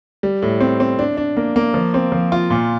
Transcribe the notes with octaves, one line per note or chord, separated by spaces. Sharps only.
G3
A2
C4
C4
D4
D4
A#3
A#3
F3
C4
F3
F4
A#2